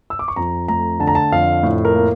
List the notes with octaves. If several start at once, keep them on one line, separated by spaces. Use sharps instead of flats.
E6
D6
C#6
F2 A#5
A3 A#5
D3 A5
A#5
A5
F2 F5
A2
A#4
A#3